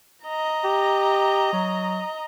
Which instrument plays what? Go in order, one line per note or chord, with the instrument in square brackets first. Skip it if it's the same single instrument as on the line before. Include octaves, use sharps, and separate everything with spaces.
[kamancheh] D#5 A#5
[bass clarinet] G4
F#3